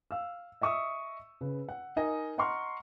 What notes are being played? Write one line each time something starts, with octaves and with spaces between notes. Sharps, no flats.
F5 E6
D#5 E5 C#6 D#6 E6
C#3 B4
F#5
D#4 A#4 D#5 G#5
D#5 F#5 A#5 C6 C#6 F6